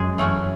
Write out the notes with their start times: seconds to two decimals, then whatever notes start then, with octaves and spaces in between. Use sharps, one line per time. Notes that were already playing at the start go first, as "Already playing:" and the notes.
Already playing: F#2 G#3 G#4
0.18 E3 A3 C#4 F#4